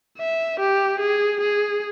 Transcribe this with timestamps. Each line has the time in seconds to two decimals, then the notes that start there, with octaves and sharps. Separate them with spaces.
0.18 E5
0.60 G4
1.01 G#4
1.41 G#4